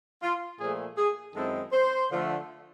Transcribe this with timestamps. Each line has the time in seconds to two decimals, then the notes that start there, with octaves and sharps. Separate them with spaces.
0.23 F4
0.60 A#2 F3 A3 G#4
0.98 G#4
1.35 F#2 D#3 G#3 C4 E4 A4
1.72 C5
2.10 D3 F3 A3